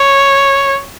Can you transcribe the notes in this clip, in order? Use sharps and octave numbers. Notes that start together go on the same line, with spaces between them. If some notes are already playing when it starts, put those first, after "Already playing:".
Already playing: C#5